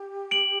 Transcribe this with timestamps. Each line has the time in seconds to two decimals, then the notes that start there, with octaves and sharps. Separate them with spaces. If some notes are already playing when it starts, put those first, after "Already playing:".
Already playing: G4
0.31 D7 F#7